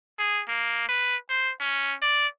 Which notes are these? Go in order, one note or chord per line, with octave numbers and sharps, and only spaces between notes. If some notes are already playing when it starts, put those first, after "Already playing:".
G#4
A#3
B4
C5
C#4
D5